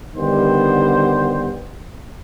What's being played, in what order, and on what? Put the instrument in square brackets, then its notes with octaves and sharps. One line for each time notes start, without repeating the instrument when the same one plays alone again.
[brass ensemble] D3 D#3 G3 B3 C5